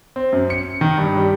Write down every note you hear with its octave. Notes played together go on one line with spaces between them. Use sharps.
C4
F#2
C#7
D#3
G2
G3